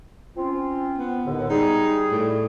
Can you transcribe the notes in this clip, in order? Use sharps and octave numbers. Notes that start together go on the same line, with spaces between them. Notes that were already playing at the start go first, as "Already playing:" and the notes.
C4 C#4 F4
B3
D#2 A2 D3
G3 D#4 G#4
A2